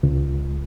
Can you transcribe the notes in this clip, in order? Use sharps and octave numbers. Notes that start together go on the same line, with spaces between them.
C#2